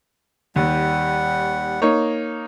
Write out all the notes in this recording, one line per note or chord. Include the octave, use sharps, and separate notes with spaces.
D#2 G3 F#5
A#3 D#4 C#5